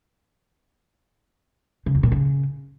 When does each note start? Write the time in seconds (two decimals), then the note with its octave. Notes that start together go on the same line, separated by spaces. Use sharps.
1.86 C#3
1.95 E2
2.03 A#2
2.12 C#3